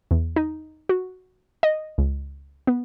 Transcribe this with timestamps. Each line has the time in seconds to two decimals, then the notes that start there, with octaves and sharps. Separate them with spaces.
0.11 E2
0.36 D#4
0.89 F#4
1.63 D#5
1.98 C#2
2.67 B3